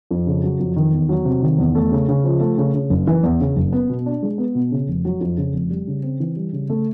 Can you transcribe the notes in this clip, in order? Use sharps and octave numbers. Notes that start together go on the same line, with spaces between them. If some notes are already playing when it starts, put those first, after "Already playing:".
F2
C#3
F#3
F2
D#3
E2
F#3
C3
D#3
E2
A3
C#3
C#3
F3
A3
C#3
C#3
F#1
E3
E2
C#3
F#1
B3
B2
D4
G#3
B3
B2
C#3
F1
F#3
F2
C#3
F1
G3
C#3
C4
E3
G3
C#3
A3